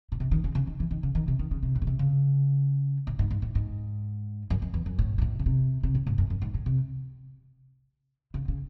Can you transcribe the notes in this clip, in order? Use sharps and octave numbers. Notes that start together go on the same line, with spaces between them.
A2
C3
D#3
C#3
C#3
D#3
E3
D#3
C#3
D#3
C3
D#3
C#3
C3
A2
C#3
C3
C#3
A2
G#2
G#2
A2
G#2
F#2
F#2
E2
F#2
A2
G#2
A2
C#3
C3
C3
A2
G#2
F#2
F#2
G#2
A2
C3
C#3
C#3